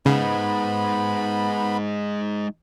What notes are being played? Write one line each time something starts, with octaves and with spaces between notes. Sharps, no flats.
C#3 G#3 B3 D#4 B5